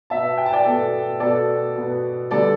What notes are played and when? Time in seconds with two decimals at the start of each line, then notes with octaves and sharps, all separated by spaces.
0.10 B2 B3 E5 A5
0.38 G5
0.46 A5
0.53 D5 G5
0.65 B2 B3 A4
1.20 B2 B3 A4 D5
1.75 B2 B3
2.31 D3 G3 B3 A4 D5